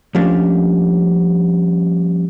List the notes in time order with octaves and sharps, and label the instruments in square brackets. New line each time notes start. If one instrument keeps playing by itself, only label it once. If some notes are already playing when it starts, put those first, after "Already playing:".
[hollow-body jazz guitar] F3 G3 A3 A#3 C#4 D4